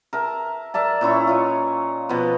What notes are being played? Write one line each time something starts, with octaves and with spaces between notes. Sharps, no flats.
A#4 E5 A5
A#4 D5 E5 A5
A#2 C#4 E4 C#6
F4 C#5 D#5
B2 F3 B3